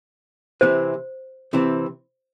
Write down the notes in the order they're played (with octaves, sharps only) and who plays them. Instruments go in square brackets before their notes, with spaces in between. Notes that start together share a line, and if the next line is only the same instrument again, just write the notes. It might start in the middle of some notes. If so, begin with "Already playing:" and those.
[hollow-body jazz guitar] C3 E3 C4 [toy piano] C5
[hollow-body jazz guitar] C3 E3 C4